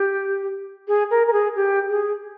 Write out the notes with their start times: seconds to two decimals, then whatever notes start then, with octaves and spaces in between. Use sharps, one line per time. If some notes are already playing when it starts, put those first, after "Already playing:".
Already playing: G4
0.88 G#4
1.11 A#4
1.27 A#4
1.33 G#4
1.56 G4
1.89 G#4